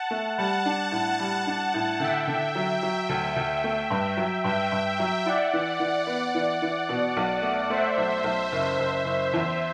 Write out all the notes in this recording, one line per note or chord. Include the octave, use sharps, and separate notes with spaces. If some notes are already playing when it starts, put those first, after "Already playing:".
Already playing: F#5 A5
A3
G3 F#5 A5
D4
A2
G3
D4
A2
D3 E5 G5
D3
F#3
F#3
D2
D2
A3
G2
F#3
G2 E5 G5
G2
E5 G5
F#3
E4 D5 F#5
E3
E3
B3
E3
E3
B2
B1
A3
A3 C5 E5
B1
B1
F#1
F#1
F#1
E2